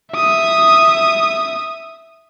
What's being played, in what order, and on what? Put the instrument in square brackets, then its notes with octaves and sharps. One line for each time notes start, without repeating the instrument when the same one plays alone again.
[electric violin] E5 D#6